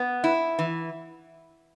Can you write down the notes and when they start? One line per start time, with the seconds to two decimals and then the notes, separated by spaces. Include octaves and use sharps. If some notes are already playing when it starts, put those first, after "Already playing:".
Already playing: B3
0.24 E4
0.59 E3